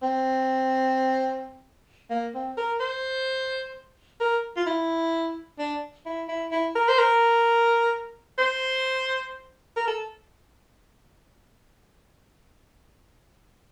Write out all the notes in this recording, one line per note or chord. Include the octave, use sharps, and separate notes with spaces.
C4
A#3
C4
A#4
C5
A#4
F4
E4
D4
E4
E4
E4
A#4
C5
A#4
C5
A#4
A4